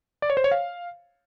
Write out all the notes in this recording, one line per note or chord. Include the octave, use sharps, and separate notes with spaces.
D5
C#5
C5
C#5
F5